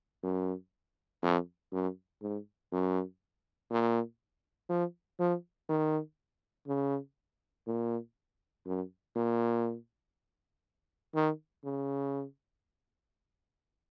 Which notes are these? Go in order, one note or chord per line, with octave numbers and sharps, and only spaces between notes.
F#2
F2
F#2
G#2
F#2
A#2
F3
F3
D#3
C#3
A#2
F#2
A#2
D#3
C#3